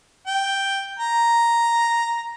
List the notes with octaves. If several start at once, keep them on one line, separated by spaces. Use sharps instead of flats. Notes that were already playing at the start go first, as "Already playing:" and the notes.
G5
A#5